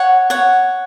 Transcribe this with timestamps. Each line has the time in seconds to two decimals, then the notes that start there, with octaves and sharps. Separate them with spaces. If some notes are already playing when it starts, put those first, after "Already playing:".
Already playing: C#5 F#5
0.30 C#5 F#5